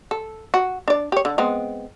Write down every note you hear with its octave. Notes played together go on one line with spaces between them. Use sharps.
A4
F#4
D4 D5
G4 C#5
D3
G#3 B3 C4